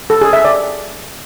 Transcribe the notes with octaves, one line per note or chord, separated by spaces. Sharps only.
A4
G#4
E5
D5